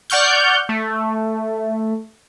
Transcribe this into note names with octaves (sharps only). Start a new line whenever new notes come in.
D5 F#5 C#6 F6 G6
A3